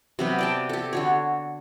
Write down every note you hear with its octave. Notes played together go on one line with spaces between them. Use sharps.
C3 F#3 B3
D5 G5 A5
G4 A4
D3 F#4 C#5